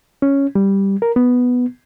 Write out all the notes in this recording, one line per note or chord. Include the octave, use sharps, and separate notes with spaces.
C#4
G3
A#4
B3